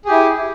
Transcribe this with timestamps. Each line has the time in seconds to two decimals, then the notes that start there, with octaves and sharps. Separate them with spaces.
0.05 G#4
0.08 G4
0.11 E4